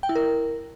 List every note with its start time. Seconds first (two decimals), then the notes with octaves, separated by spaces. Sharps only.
0.03 G5
0.09 E4
0.15 A#4